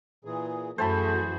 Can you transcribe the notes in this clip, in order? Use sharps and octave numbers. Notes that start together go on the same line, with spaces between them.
A#2 E3 G#4
F#2 E3 A3 F#4 G#4 C5 A5 B5